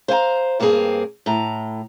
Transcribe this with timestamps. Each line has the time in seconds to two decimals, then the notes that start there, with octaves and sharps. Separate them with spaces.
0.08 C5 F5 G#5 A#5
0.60 G2 A#3 C4 D4 G#4 A#4
1.26 A2 A#5